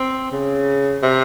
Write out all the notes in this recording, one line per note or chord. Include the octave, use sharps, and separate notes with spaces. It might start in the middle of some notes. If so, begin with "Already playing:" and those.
Already playing: C4
C#3
C3